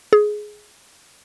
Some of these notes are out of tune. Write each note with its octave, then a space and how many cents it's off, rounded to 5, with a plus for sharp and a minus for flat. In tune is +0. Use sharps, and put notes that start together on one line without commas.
G#4 +10